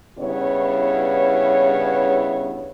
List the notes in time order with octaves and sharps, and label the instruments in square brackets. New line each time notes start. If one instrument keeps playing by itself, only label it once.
[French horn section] G2 C#3 B3 E4 C#5